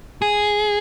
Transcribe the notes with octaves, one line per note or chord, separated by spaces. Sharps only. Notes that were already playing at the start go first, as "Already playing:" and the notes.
G#4